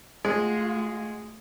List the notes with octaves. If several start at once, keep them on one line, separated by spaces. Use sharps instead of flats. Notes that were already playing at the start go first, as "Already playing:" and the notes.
G#3 A3 F4 F#4